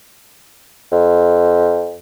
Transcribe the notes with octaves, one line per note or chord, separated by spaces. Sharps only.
F2